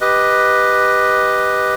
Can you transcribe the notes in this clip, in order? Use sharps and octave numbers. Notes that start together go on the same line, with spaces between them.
G4 B4 D#5